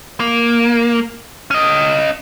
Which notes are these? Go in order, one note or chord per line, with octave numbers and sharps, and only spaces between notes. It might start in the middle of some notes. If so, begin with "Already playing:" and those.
A#3
C#4 D#5